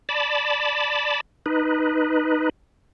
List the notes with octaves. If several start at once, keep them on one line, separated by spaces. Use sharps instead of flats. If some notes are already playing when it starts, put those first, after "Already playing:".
D5 A5 B5
D#4 B4